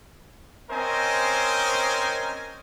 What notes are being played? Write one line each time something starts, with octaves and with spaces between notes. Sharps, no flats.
C4 C#4 A#4 C5 D#5 G#5